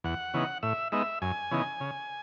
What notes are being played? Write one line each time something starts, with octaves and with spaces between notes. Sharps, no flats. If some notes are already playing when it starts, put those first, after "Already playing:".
E2 F#5
C#3 E3 B3 D#4
A2 E5
G#3 B3 D#4 E5
F#2 G#5
C#3 E3 B3 D#4
C#3